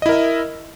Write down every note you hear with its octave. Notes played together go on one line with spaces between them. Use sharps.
E4 A#4 D#5 E5